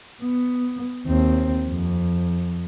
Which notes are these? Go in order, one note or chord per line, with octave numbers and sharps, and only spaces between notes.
B3
D#2 C4
F2